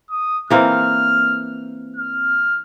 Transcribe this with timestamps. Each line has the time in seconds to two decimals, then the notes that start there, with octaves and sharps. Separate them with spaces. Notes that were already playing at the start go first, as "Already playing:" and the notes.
0.10 D#6
0.50 E3 A#3 C4 F6
1.96 F6